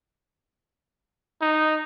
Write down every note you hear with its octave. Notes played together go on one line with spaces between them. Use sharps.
D#4